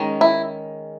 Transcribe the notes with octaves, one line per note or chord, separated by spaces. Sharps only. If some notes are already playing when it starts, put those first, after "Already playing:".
Already playing: D#3 G#3 C#4
E4